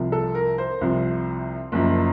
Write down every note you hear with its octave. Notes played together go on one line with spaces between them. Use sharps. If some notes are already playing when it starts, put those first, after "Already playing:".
Already playing: C2 C3 F3
A4
A#4
C5
C2 C3 F3
F#1 F#2 F3